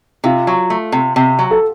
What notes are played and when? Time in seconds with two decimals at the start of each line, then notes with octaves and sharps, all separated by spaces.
0.24 C3 F4
0.47 F#3
0.70 A3
0.92 C3
1.16 C3
1.39 F#3
1.51 A4